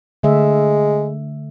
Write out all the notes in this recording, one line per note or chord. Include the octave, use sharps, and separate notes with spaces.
D3 G#3 A3 E5